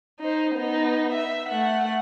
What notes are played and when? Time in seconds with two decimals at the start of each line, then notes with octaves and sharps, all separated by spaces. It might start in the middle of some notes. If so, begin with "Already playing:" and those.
0.20 D#4 C5
0.55 B3 D#4
1.12 E5
1.49 A3 F#5